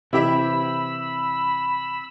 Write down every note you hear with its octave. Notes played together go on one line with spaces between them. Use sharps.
C3 E3 E4 G4 E5 B5 E6